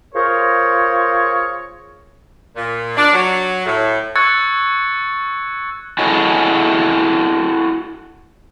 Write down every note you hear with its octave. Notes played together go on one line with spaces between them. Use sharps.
F4 G#4 A#4 C5 C#5
A#2
D4
F#3
A2
C#6 E6 F#6 G#6 A6 C#7
E4 F#4 G#4 A4 C#5 D#5